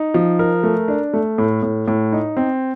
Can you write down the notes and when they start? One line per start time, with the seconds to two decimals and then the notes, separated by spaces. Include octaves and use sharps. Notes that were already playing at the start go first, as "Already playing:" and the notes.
Already playing: D#4
0.14 F3
0.39 A#4
0.63 A3
0.88 D4
1.13 A3
1.38 A2
1.63 A2
1.88 A2
2.12 D#4
2.37 C4